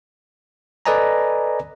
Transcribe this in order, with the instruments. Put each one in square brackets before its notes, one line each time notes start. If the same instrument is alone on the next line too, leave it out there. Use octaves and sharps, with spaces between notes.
[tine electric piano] A4 B4 D5 D#5 G#5 A#5